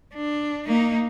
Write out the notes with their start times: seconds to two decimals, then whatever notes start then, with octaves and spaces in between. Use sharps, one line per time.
0.14 D4
0.67 A#3 D#4